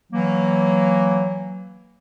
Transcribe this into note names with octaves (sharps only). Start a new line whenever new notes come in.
E3 F#3 A#3